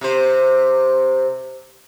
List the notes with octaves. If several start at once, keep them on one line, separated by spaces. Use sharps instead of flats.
C3 C5